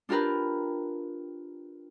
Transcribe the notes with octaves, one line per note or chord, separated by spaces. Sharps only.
D4 F4 G4 A#4 B4